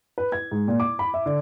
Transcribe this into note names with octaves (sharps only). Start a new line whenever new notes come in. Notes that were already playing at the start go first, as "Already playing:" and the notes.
B4
G#6
G#2
A#2
D6
B5
E5
D3